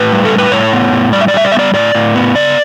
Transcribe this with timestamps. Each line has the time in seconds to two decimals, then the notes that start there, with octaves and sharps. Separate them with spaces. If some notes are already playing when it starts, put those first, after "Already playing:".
Already playing: A2 B4
0.12 G3
0.25 A4
0.31 A2
0.38 B4
0.52 A2 C#5
0.73 B3
0.92 A2
1.13 G3 D5
1.21 E5
1.28 D5
1.34 G3 E5
1.45 D5
1.52 B3 E5
1.59 D5
1.74 A2 D5
1.95 A2
2.15 B3
2.35 C#3 D5